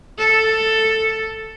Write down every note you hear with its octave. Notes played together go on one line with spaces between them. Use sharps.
A4